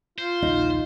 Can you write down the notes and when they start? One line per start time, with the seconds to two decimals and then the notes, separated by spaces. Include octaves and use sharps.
0.18 F4 C5
0.42 A#1 D#2 D#4